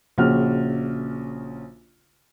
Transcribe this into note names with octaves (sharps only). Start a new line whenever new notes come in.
A#1 C#3 F#4 F6